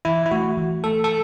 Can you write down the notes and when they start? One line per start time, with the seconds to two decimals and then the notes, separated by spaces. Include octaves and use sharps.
0.05 E3 E4
0.26 E4
0.31 A3 F#4
0.57 E3
0.84 A3 A4
1.04 A4